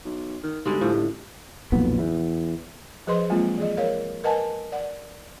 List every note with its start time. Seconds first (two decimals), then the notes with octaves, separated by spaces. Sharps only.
0.05 B1
0.43 D#3
0.65 B1 D3 G3 G#3
0.81 A2 F3
0.94 C#2
1.72 B1 F2 A#2 B3
1.99 E2
3.07 F3 G#4 B4 C5 D#5 C6
3.29 F#3 G#3 A#3 C4 F4
3.58 E3 G#4 D#5
3.77 A#4 C#5 F5
4.24 A#4 B4 D#5 F#5 G#5 A5
4.72 D5 F#5